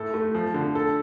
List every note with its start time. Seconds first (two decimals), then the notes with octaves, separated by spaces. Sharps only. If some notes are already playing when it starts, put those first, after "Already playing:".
Already playing: A2 A4
0.14 A3
0.34 F3
0.54 D3
0.75 A4